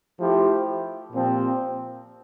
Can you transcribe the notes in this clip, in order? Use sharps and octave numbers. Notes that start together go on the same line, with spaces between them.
F3 A3 E4 G4
A#2 F3 C4 G4